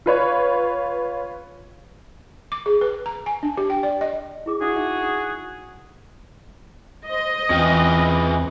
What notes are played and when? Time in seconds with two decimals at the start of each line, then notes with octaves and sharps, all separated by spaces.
0.06 F4 B4 C#5
2.52 D6
2.66 G#4
2.81 B4
3.06 A#5
3.26 G#5
3.43 D4
3.57 G4
3.70 G5
3.83 D5
4.01 D#5
4.46 E4 G#4 D6
4.61 D4 E4 F#4 G#4 E5
4.76 D#4 E5
7.09 C5 D#5
7.50 E2 E3 C4 C#4 F4 G5